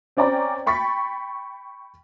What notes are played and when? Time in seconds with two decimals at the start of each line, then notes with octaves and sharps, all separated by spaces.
0.17 C4 C#4 D5 G5 A#5
0.66 G5 B5 C#6 A6 B6